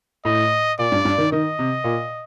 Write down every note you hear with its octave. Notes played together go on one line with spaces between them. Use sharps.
A2 D#5
A#2 D5
G2
G2
D#3
D#3 D#5
C3
A#2